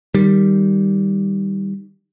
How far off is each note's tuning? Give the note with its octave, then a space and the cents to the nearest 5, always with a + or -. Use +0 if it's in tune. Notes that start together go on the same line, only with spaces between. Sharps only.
D#3 +0 G3 +0